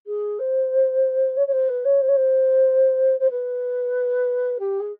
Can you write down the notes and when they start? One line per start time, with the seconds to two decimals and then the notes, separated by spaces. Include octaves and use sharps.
0.06 G#4
0.39 C5
1.36 C#5
1.46 C#5
1.51 C5
1.68 B4
1.84 C#5
2.01 C5
2.07 C#5
2.15 C5
3.19 C5
3.30 B4
4.59 G4
4.79 G#4